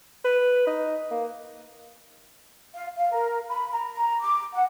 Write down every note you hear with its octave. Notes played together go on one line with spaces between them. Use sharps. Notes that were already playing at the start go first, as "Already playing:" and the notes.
B4
D#4
A#3
F5
F5
A#4
B5
A#5
A#5
D6
F#5